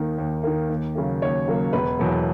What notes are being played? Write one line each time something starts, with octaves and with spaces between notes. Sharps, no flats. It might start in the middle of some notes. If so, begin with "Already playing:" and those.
Already playing: D#2 D#3 A#3
D#2
D#3 A#3
D#2
C#3 F#3 A#3
D#2 C#5
C#3 F#3 A#3
E1 B4
E2 B2 F#3 A#3